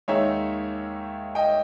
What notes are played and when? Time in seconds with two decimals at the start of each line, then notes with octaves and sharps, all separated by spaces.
0.08 D#2 D#3 G#3 D#4 C#5 E5
1.35 D#5 G5